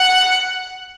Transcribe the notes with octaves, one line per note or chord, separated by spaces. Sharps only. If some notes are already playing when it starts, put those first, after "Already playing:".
Already playing: F#5